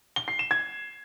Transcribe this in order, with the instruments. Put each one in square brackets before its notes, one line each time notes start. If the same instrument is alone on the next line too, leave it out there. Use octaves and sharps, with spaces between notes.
[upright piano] G7
C7
E7
G#6